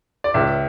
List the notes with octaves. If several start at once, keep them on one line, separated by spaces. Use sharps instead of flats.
D5
C#2 E5